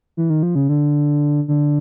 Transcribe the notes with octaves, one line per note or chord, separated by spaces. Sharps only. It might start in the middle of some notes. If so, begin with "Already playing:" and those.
E3
D#3
F3
C#3
D3
D3